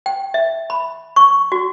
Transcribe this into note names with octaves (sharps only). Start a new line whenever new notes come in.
G5
E5
B5
C#6
F#4